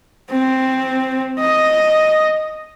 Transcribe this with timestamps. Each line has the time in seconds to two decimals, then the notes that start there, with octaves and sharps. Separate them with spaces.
0.30 C4
1.40 D#5